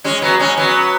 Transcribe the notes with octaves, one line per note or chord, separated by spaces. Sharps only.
G#3 C#4
F#3 B3
G#3 C#4
F#3 B3